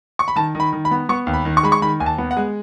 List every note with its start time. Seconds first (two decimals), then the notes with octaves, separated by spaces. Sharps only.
0.19 C#6
0.28 B5
0.36 D#3 A5
0.55 D#3
0.60 B5
0.72 D#3
0.85 B5
0.91 B3
1.09 B3 C#6
1.27 D#2
1.34 B5
1.45 D#3
1.57 C#6
1.63 G#3 B5
1.72 C#6
1.82 D#3 B5
2.00 D#2 G#5
2.06 A5
2.18 B3
2.31 F#5
2.37 G#3